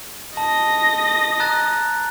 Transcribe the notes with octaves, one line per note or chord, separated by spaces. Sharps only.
D#5 A5 A#6
A#5 F#6 A6